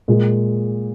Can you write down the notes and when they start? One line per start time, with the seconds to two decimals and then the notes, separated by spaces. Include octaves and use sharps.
0.08 A#2 G#3